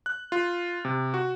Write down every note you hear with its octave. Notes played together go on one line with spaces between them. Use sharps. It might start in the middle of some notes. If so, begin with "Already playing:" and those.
F#6
F4
C3
F#4